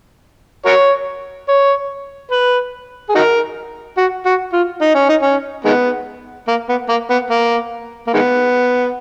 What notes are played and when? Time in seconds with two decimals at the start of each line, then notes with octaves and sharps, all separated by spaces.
0.66 F#4 A#4 C#5
1.48 C#5
2.32 B4
3.09 G#4
3.15 D#4 F#4 A#4
3.98 F#4
4.26 F#4
4.53 F4
4.81 D#4
4.95 C#4
5.09 D#4
5.22 C#4
5.65 D#3 G#3 B3
6.48 A#3
6.69 B3
6.89 A#3
7.10 B3
7.30 A#3
8.07 A#3
8.14 D#3 G#3 B3